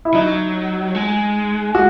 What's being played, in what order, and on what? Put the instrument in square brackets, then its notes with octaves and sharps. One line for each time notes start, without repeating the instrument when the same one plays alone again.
[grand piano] E4
[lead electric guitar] F#3 [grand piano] D#4
[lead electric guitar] G#3
[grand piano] F#4